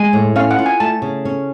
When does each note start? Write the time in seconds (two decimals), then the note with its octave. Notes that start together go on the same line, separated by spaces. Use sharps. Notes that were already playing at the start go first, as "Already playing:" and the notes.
Already playing: G#3 G#5
0.13 A2
0.36 C#4 F5
0.51 F#5
0.59 F4
0.66 G#5
0.80 A3 A5
1.02 C#3
1.25 C#4